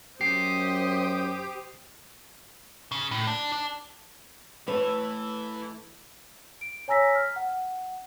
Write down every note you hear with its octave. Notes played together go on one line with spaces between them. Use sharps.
F#2 G4 C5 D#6 C7
C#3
A2
D4
D4
A2 E3 A4 B4 C#6
D7
C#5 G#5 A#5 E6 A#6 B6
F6
F#5